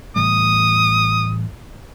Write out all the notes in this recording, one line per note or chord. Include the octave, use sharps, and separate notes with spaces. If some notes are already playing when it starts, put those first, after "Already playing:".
A2 E3 G3 D#6